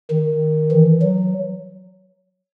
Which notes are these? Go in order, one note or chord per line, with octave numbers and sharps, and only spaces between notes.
D#3
E3
F#3